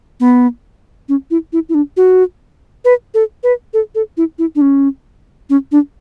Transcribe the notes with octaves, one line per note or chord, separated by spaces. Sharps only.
B3
C#4
E4
E4
E4
D4
F#4
B4
A4
B4
A4
A4
E4
E4
D4
C#4
C#4
D4